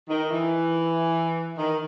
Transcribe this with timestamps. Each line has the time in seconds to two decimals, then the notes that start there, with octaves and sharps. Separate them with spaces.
0.10 D#3
0.31 E3
1.58 D#3